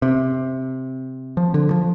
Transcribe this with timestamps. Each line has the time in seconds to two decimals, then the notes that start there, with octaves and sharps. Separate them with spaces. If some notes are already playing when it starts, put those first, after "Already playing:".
0.02 C3
1.37 F3
1.54 D3
1.71 F3